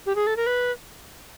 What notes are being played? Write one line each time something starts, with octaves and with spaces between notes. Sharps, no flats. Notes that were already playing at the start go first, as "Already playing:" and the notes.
G4
G#4
A4
A#4
B4